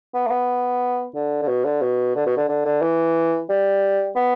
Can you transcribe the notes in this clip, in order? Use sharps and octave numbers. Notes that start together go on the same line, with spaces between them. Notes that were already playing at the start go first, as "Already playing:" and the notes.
B3
A3
B3
D3
D3
B2
D3
B2
D3
B2
D3
D3
D3
E3
G3
B3